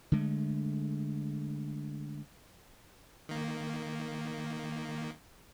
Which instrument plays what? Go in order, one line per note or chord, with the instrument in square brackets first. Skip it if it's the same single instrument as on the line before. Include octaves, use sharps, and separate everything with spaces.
[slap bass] D3 G#3 A3
[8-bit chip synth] D#3 A#3